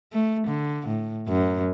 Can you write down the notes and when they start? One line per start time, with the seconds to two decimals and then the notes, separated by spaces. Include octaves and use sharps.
0.13 A3
0.47 D3
0.87 A2
1.28 F#2